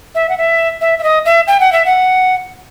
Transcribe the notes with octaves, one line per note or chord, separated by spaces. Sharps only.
E5
F#5
E5
E5
E5
D#5
E5
G5
F#5
E5
F#5